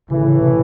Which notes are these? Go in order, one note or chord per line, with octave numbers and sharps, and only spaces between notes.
A1 A2 C#3 E3
D3
C#3
C3